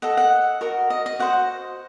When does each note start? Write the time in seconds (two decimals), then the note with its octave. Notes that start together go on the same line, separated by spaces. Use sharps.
0.02 A4 D#5 F#5
0.17 F#5
0.61 F#4 A#4 D#5
0.90 D#5
1.06 D#5
1.19 F#4 C5 D#5 F#5